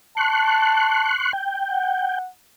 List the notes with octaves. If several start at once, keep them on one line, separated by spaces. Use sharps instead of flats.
A5 C6 C#6 F#6
G5
F#5